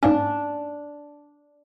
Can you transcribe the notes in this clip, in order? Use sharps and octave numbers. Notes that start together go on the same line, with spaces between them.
G#2 A#3 C#4 D4